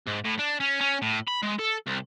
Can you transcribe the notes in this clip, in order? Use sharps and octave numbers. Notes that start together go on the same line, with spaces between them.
G#2
A2
D4
C#4
C#4
A2
B5
G#3
A4
C2